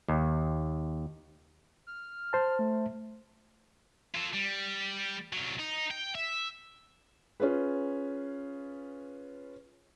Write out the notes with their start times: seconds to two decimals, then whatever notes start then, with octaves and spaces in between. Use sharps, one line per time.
0.08 D#2
1.87 F6
2.33 C5 A5
2.59 A3
4.15 F4 A4
4.34 G3
5.33 C2 F#3
5.59 D#4
5.91 G5
6.15 E5
7.40 C#4 F4 G#4 B4